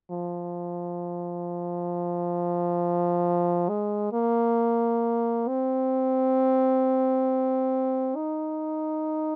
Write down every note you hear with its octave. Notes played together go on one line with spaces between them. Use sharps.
F3
G#3
A#3
C4
D#4